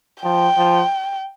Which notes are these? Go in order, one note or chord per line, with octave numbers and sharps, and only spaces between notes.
F3 G5
F3